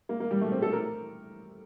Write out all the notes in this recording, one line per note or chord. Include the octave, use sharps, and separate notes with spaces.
A#3
A#3
G3
A3
C4
A4
A#4